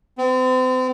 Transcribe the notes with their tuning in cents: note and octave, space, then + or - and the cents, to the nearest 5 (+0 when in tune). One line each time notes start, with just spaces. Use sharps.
C4 -35